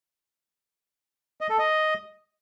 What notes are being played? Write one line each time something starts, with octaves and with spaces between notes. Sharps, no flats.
D#5
A4
D#5